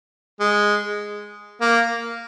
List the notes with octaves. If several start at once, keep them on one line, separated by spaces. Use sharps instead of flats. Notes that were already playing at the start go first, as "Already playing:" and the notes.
G#3
A#3